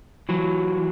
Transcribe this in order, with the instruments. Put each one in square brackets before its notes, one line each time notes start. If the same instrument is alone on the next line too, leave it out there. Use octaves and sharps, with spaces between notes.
[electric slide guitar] E3 F#3